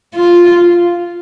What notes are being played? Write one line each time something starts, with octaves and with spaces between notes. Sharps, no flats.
F4